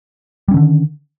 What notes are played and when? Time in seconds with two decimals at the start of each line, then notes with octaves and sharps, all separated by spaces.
0.48 G3
0.51 C#4
0.54 D#3
0.57 D3